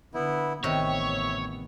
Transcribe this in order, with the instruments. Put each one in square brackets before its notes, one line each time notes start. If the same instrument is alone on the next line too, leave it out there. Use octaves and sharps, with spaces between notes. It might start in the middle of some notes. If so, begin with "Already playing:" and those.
[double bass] D3 [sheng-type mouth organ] B3 E4
[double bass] A1 B3 [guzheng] C3 D#3 [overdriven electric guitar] C#5 [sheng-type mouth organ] E5